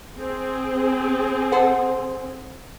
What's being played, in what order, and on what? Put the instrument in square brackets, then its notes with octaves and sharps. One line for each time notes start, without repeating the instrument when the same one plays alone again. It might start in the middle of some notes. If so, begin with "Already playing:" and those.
[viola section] C4 G#4
[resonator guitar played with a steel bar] A4 C5 F#5